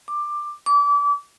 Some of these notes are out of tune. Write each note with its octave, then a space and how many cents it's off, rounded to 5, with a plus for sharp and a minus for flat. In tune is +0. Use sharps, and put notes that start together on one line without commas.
D6 +15
D6 -30